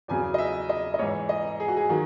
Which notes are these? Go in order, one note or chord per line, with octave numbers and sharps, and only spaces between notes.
E2 C#3 F#3 G#5
D#5
E5
D#5
D#5
G#2 E3 C#5
D#5
G#4
F#4
G#4
D#3 F#3 F#4